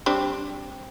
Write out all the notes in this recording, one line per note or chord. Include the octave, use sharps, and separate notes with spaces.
G3 C4 D4